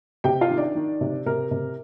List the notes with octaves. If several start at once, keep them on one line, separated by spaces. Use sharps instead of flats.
C3 G4 G5
F4 F5
D#3
D4 D5
D#3
C3
C3 A#4
C3